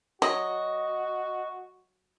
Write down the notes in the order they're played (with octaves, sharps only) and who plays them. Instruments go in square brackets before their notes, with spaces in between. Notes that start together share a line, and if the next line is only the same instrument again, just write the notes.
[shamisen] F#3 [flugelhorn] F#4 [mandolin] D#5